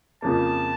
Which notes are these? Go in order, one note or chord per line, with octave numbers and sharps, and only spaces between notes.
F2 C#3 F3 A#3 A5